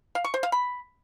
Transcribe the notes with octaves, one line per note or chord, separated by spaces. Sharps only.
F5
C#6
C5
F5
B5